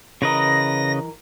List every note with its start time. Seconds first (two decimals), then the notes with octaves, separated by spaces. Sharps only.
0.22 C#3 E3 A#4 B4 D#5 A#6